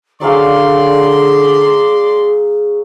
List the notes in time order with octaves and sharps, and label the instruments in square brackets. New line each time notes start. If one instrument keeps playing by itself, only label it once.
[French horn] D3 [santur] F#3 C#4 F5 [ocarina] G#4 [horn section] D5 C6